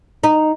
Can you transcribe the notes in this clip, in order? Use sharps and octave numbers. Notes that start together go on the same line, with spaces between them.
D#4